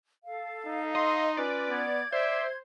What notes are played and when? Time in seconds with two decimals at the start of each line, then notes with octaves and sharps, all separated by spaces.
0.24 A4 F5
0.66 D#4
0.95 D#5 C6
1.37 C#4 F4 B4 D5
1.69 B3 G#6
2.12 C5 D5 E5